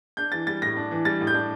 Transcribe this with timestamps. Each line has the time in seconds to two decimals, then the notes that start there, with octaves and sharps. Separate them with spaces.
0.17 D4 G6
0.32 E3 A6
0.47 G3 A6
0.62 A2 A#6
0.77 D4
0.91 E3
1.05 G3 A6
1.21 A2
1.27 G6
1.34 D4